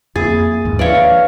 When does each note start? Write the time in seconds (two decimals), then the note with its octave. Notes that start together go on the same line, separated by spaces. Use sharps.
0.16 F2 A#3 G#4 A6
0.65 D#2 G#2
0.79 F3 D4 B4 C#5 D5 E5 F5